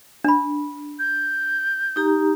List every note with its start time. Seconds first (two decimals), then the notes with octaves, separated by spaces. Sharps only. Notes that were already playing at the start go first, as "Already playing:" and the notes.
0.24 D4 B5
0.99 G6
1.96 D#4 G4 A#5